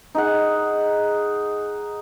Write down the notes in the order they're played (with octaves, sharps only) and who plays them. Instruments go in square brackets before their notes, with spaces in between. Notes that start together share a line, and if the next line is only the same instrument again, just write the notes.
[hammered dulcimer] D#4 G#4 F#5